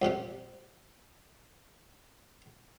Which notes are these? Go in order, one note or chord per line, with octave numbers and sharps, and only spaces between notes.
C2 F2 C3 G3